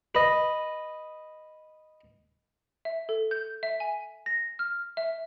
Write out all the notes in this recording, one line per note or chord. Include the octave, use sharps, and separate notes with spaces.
B4 D#5
E5
A4
G6
E5
G#5
A#6
F6
E5